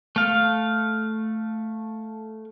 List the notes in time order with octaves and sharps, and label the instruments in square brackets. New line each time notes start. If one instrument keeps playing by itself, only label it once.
[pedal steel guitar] A3 F5